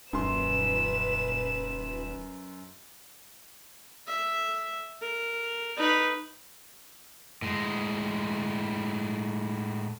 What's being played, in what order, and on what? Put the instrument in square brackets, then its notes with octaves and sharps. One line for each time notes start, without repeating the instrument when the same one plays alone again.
[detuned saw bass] D#1 [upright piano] F#2 C6 [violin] B4 E7
[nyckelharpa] E5
A#4
D#4 B4
[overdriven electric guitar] A2 G#3